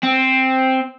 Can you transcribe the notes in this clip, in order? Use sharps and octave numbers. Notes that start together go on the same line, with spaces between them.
C4